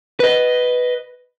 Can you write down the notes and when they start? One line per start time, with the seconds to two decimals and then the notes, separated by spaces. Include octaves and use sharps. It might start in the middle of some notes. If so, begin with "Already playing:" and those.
0.20 B4 D#5